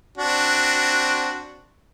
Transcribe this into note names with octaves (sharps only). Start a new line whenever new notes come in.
C4 D4 F#4